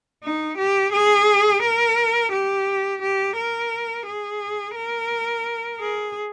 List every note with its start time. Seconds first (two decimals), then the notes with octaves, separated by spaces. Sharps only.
0.24 D#4
0.58 G4
0.93 G#4
1.62 A#4
2.32 G4
3.02 G4
3.37 A#4
4.06 G#4
4.76 A#4
5.80 G#4